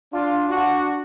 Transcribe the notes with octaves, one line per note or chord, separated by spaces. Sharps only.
D4 F4
D4 F#4